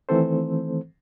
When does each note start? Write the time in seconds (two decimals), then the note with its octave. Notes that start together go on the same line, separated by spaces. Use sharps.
0.09 D#3 E3 A3 C4 A4 C5